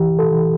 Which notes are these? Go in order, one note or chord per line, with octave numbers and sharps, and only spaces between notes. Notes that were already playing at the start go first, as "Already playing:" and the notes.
Already playing: E3 G4
A4
E3